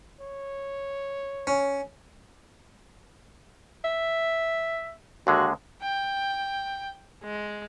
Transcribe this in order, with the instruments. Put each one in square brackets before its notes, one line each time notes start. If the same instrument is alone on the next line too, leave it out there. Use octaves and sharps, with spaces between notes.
[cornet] C#5
[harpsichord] C#4
[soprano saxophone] E5
[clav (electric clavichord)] D#2 D3 G#3 [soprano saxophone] F#4
[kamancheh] G5
G#3